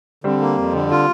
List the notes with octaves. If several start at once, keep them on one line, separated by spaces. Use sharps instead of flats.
D3 G3 C4
A#3
F2
D3
F4